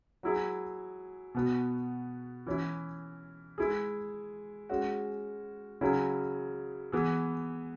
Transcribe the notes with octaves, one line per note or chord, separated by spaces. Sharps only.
F#3 E4 G#4
B2 B3 F#4
E3 C#4 E4
G#3 E4 G#4
G#3 C#4 F#4
C#3 F#3 C#4 E4 G#4
E3 B3 G#4